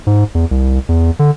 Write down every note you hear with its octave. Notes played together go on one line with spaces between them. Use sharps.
G#2
E2
C2
E2
D3